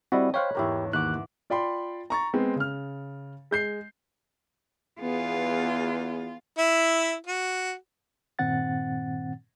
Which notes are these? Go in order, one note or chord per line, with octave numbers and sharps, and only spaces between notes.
G3 C4 E4 F#4 D#5
C5 C#5 F5 G5 B5 C#6 F#6
E2 G#2 A#3 E4 G4 A#4
D#2 E5 F#5 D6 F#6
F4 D5 G5 B5 C6
A#5 C#6 A6
G#3 B3 C4
C#3 F6
G#3 G6 C7
E2 B3 F4 G#4
E4 E5
F#4
G2 A#2 D#3 C4 F#5 A6